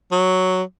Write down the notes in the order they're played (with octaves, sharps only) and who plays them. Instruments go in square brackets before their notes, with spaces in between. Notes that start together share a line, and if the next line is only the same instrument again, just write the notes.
[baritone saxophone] F#3